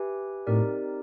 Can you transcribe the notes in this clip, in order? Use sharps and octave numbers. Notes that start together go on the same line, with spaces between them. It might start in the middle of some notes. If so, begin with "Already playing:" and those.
Already playing: G4 B4 E5 G#5
A2 C4 D#4 G4 A#4 D5